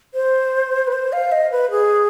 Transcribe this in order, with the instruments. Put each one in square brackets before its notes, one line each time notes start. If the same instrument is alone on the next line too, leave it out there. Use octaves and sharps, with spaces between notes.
[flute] C5
B4
C5
F5
D#5
B4
G#4